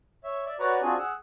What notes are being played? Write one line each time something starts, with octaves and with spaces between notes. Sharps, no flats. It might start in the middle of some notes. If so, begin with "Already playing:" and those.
C#5 E5
D5 E5
F#4 B4 C#5 D5 F#5 A#5
C4 D4 F4 F#4 G#4 G#5
G#4 F#5 E6